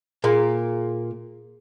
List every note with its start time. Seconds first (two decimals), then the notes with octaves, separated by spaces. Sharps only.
0.24 A#2 A#3 G#4 C6